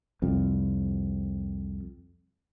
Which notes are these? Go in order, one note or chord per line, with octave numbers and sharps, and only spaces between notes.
C2 F2